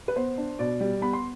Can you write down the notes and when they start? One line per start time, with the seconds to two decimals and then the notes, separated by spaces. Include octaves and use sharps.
0.08 B4
0.16 B3 C5
0.38 D4
0.59 B2 D5
0.81 G3
1.02 B3 B5
1.13 C6